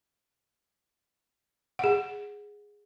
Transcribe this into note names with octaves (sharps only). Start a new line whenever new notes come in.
G#4 F#5